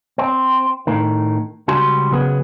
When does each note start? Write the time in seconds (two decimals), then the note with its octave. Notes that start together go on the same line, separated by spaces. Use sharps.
0.18 C4
0.87 A2 D#3
1.68 C#2 G3 F#4 G#5 C6
2.11 C#3 F#3 B3 G#4